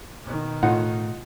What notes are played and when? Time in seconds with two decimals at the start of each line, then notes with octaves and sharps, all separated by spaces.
0.23 B2 D#3
0.63 A2 D#4 F4 F#5